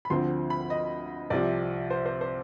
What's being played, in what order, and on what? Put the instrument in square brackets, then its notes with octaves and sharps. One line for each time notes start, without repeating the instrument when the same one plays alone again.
[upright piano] B5
D2 D3 F3 C4 C6
B5
D#5
C2 C3 F3 D5
C5
C5
C5